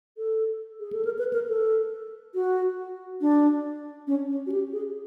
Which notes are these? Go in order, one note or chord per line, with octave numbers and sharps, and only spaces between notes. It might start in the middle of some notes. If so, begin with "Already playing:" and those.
A4
G#4
A4
A#4
B4
A#4
A4
F#4
D4
C#4
C#4
F#4
G4
G#4